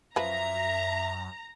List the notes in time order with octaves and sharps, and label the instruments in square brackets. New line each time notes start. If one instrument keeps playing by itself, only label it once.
[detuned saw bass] F#2 [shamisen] F3 B4 [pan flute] E5 [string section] A#5